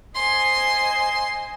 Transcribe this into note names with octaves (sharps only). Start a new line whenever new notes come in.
C5 D#5 G#5 C6